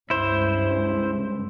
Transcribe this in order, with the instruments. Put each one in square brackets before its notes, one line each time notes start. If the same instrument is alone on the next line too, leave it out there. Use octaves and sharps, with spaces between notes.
[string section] C#2 G2 [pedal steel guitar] E4 C5